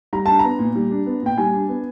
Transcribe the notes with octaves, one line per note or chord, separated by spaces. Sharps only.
G3 A#5
D4 A5
B3 A#5
A#2
G3
D4
B3
A#2 G5
G3 G#5
D4
B3